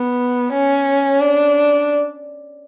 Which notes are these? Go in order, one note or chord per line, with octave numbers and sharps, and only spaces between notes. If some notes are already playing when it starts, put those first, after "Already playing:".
Already playing: B3
C#4
D4